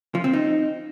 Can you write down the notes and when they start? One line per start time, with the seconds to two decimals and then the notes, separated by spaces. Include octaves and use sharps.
0.15 F3
0.24 C4
0.33 D#4